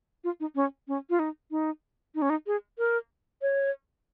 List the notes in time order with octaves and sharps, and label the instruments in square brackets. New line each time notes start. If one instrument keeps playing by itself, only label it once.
[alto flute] F4
D#4
C#4
C#4
F4
D#4
D#4
D#4
C#4
D#4
G#4
A#4
C#5